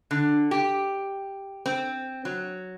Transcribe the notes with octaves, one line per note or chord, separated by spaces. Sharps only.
D3
G4
C4
F#3